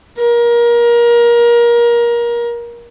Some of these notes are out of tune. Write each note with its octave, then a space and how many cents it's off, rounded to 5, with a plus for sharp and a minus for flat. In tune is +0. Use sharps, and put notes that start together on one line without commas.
A#4 +25